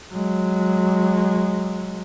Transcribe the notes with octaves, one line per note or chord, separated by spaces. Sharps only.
F#3 G#3